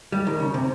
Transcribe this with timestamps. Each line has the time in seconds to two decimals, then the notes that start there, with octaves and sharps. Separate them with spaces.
0.12 G3
0.27 D#3
0.40 C#3
0.54 C3